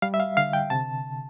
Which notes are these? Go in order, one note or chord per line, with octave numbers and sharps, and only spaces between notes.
G3 F5
E5
F5
D3 F5
G5
C3 A5